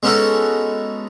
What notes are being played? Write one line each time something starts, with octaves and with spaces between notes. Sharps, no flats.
G#3 B3 C#4 D#4 F#4 A4